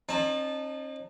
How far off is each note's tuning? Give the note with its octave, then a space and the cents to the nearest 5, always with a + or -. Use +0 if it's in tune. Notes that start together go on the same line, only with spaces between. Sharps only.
C4 +45 D#4 -30 A5 -10